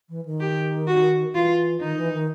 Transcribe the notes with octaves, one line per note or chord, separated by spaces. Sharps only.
E3
D#3
G4
F#4
E3 F4
D#3 D#4
E3
D#3